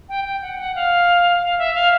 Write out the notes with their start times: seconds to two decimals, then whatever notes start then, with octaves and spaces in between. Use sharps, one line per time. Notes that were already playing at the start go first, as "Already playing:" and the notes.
0.09 G5
0.24 G5
0.42 F#5
0.59 F#5
0.75 F5
1.42 F5
1.58 E5
1.74 F5